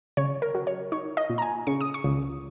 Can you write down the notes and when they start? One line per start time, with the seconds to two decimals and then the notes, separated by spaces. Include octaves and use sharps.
0.17 C#3 C#5
0.42 A#4
0.55 F#3
0.67 C#5
0.92 D#4 C#5
1.17 D#5
1.30 A#2
1.38 A#5
1.42 G#5
1.67 C#3 C#6
1.81 D#6
1.94 C#6
2.04 C#2